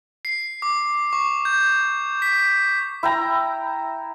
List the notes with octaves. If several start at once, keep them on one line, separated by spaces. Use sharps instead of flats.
C7
D6
C#6
G6
B6
E4 G5 A#5